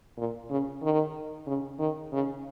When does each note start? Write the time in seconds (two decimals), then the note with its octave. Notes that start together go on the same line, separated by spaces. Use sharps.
0.18 A#2
0.50 C#3
0.82 D#3
1.47 C#3
1.79 D#3
2.12 C#3